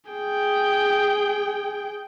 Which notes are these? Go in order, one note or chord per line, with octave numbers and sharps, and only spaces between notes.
G#4 G5